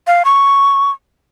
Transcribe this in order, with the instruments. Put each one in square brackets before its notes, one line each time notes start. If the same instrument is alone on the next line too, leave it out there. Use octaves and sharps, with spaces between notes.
[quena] F5
C#6